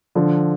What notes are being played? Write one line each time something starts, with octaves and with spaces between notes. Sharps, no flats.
D3 F3